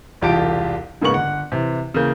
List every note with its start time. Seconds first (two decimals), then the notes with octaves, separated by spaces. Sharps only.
0.22 E1 C2 F4 G4 A5 D7
1.01 G#2 C#3 A#3 B3 C#6 F#7
1.14 G1 F#5
1.52 C3 E3
1.94 C#3 E3 A#3 G6